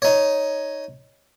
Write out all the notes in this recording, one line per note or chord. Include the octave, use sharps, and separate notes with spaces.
D#4 C#5